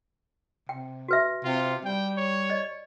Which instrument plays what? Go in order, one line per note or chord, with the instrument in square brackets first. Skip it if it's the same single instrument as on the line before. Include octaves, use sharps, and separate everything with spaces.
[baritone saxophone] C3 [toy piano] G5
[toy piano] F#4 B4 E5
[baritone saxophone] C3 [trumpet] F4
[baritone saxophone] G3 [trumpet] G5
[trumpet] C#5
[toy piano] D5 D#5